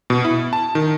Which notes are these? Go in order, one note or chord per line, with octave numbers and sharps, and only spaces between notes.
B2
E4
A5
D#3